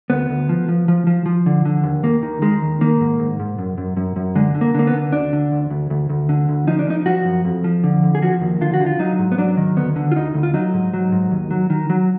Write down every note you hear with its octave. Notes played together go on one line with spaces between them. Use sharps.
D2 B3
D2
F3
F3
F3
F3
F3
D3
D3
D#2
D#2 A#3
D#3
D#3 G#3
D#2
D#3 A#3
G#2
G#2
G#2
F#2
F#2
F#2
F#2
D3 G#3
D3
A#3
D3 A#3
B3
D3
D2 D4
D3
D2
D2
D2
D2
D3
D2
F3 D#4
D4
F3 D#4
F3 F#4
F#2
F2
F3
D3
F2
G#4
F3 F#4
D#2
D3 F4
F#4
D3
F4
F#3 D#4
G#2
B3
F#3 D4
D#3
D2 B3
D3
F4
D2 D#4
D2
F4
F#3 D#4
G#2
F#3
G#2
D#2
F#3
D#3
F#3